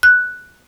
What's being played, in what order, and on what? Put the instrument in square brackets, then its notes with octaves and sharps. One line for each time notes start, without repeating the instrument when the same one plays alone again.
[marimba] F#6